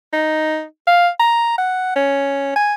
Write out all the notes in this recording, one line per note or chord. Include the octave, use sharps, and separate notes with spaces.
D#4
F5
A#5
F#5
C#4
G#5